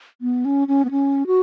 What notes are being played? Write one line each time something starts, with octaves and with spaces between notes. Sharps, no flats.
B3
C#4
C#4
B3
C#4
F#4